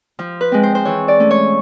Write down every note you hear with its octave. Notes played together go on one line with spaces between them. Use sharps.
F3
B4
G#3 C4
C5
C5
E3 C#5
D5
A3 C#4
C#5